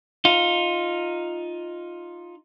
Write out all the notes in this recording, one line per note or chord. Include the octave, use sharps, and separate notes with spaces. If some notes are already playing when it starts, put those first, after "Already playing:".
D#4 F4